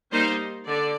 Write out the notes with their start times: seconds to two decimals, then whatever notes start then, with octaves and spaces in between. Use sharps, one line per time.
0.12 G3 A#3 D#4 C5
0.67 D3 D5